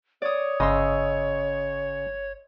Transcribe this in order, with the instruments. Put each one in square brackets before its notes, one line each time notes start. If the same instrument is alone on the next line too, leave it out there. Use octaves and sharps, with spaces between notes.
[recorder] C#5 [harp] D5 D#6
[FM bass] G1 [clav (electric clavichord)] C#3 [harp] D#5 C6 E6